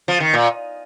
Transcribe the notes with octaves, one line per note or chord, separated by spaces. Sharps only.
F3
D#3
A#2